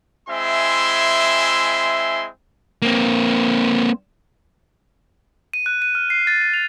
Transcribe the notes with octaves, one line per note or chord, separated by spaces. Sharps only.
G#3 C4 E4 E5 G#5 C6
A#3 C4
D#7
F#6
D#7
F6
C7
A6
D#7
F7